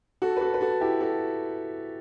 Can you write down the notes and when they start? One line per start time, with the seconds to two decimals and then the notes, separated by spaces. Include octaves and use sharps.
0.22 F#4 A4
0.37 B4
0.41 F#4 A4
0.54 B4
0.61 F#4 A4
0.81 E4 G4
1.01 F#4 A4